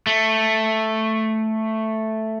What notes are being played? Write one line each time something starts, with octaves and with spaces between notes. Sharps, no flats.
A3